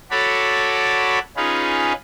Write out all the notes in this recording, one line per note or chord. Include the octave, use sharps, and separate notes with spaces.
F#4 A4 C#5 D5 B5
C#4 D#4 F4 G#4 B4